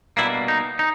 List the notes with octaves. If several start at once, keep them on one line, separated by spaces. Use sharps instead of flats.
B2 G3 A#3 D4 E4
D#4
D#4